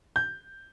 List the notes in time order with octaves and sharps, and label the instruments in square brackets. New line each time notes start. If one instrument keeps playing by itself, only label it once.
[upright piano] G6